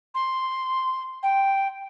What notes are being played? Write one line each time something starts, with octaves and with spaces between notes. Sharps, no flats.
C6
G5